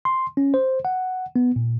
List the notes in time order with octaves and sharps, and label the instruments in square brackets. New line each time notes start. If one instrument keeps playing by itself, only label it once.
[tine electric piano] C6
C#4
C5
F#5
B3
A#2